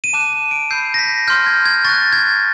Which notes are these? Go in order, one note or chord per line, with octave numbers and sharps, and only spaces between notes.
D#7
A5 D6 F#6 E7
D#7
D7
B5 E6 G6 C7
A#6
B6
C6 F6 G6
G#6
G#6
C#6 F#6 A6
G#6